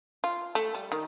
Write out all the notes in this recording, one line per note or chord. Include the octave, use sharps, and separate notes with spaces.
F4
A3
G3
D#3